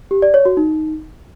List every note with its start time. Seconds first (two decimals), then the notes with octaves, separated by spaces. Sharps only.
0.11 G4
0.22 D5
0.34 C#5
0.45 F#4
0.57 D#4